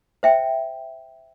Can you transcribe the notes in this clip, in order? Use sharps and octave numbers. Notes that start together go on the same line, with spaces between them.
C5 E5 G5